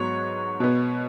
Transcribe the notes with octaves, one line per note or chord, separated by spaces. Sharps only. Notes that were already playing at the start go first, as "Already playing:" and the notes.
Already playing: G#2 F#3 B3 C#5
B2 B3